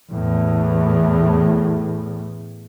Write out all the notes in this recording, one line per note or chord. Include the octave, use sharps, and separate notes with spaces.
E2 A2